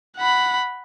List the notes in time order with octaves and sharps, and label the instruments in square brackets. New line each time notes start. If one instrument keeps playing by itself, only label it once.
[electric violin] F#5 B5